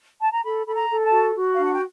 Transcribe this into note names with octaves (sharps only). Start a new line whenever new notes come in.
A5
A#5
A4 B5
A4 B5
A#5
A4
A5
F#4
F#4
D4 F5
F#5
G5